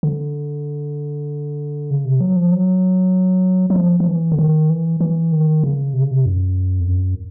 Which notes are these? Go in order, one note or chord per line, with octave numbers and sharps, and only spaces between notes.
D3
C#3
C3
F#3
F3
F#3
F#3
F3
F3
E3
D3
D#3
E3
E3
D#3
C#3
C3
C#3
C3
F#2
F2
F#2